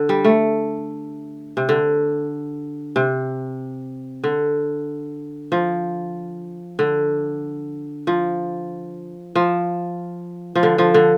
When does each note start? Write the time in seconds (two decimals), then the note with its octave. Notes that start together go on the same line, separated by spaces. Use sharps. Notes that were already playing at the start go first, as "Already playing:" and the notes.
Already playing: D3
0.09 G3
0.24 A3
1.57 C3
1.69 D3
2.96 C3
4.24 D3
5.52 F3
6.79 D3
8.07 F3
9.35 F3
10.55 F3
10.63 D3
10.78 F3
10.94 D3